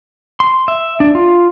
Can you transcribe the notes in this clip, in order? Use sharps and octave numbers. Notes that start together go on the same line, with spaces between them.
C6
E5
D4
F4